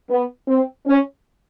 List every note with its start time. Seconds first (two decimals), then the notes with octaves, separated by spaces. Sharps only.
0.10 B3
0.48 C4
0.87 C#4